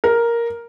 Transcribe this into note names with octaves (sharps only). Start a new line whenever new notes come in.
A#4